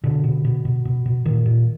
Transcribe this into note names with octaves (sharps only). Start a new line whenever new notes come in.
B2 D3
B2
B2
B2
B2
B2
A#2 D#3
A#2